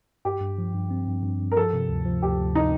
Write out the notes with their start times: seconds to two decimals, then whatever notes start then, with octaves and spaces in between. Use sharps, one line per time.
0.25 G2 G4
0.41 G2
0.58 F3
0.74 G2
0.91 C4
1.08 G2
1.23 G2
1.40 G2
1.52 A#4
1.57 F3 A4
1.73 C3
1.89 D2
2.06 F3
2.22 D2 G4
2.40 D2
2.55 C3 D#4